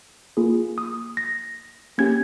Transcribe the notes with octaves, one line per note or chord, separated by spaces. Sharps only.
A#3 F4 G#4
D#6
A#6
A#3 C#4 G4 G#6